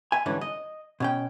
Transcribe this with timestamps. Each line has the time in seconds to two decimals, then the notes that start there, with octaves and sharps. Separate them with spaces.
0.12 E5 G#5
0.26 G#2 D3 E3 G3 C#4
0.41 D#5
1.00 B2 C#4 G5